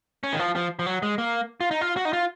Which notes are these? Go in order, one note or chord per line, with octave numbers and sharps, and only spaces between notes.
C#4
D#3
F3
F3
F3
F#3
G#3
A#3
F4
D#4
F4
F#4
D#4
F4